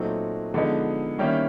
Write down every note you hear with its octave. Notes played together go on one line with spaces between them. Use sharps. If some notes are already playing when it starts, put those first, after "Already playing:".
Already playing: A#2 F#3 A3 C4 D#4
D3 F3 G#3 B3 D#4
D#3 G3 A#3 C#4 E4